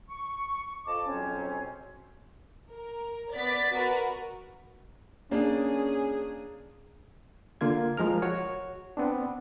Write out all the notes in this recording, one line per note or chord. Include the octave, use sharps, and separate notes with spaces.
C#6
F2 F3 D#5 A5 D6
F2 G#2 B2 F#3 C4 C#4
A#4
B3 D5 A6 B6
F#4 A#4 B4
A#3 C#4 D4 G#4
D3 A#3 F4 G#6
F3 G#3 A#4 F6
F#4 C#5
B3 C4 D4